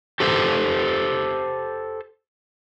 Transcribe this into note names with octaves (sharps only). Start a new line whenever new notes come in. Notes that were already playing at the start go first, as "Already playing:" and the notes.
G4 A4 C5